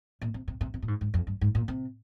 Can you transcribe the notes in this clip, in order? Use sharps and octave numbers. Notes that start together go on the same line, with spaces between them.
A#2
C3
C3
C3
C3
A#2
G#2
G#2
F2
G2
G#2
A#2
C3